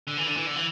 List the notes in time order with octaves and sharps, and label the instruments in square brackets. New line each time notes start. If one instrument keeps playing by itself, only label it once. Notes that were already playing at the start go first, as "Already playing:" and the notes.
[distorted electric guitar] D3
E3
D3
E3
D3
E3